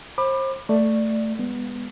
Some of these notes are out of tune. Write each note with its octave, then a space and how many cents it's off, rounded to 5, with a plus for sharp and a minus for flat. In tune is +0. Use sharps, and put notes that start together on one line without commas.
C5 +35 B5 +0 D6 +30
A3 +10 D5 +5
G#3 -40 B3 +0